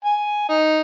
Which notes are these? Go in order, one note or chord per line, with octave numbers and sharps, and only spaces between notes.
G#5
D#4